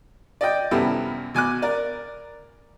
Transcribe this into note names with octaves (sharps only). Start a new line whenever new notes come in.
D5 D#5 G5
C2 F#2 G3 B3 E4 A4
B2 G#5 D6 F#6
A#4 D5